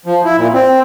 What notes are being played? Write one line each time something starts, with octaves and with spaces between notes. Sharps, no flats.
F3
E4
A#2
C4